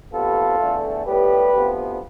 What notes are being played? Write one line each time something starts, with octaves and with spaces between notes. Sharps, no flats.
D2 C3 G3 B3 F4 A4
E2 D3 A3
A2 G3 B3 G4 B4
D2 C3 F3 B3